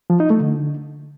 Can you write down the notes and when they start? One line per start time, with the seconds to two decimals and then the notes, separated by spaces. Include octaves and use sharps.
0.10 F3
0.20 D#4
0.30 A3
0.40 D3